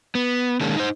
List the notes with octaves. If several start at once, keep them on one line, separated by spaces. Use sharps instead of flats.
B3
D#3 G#3 A#3 C#4 D4
D#4 C5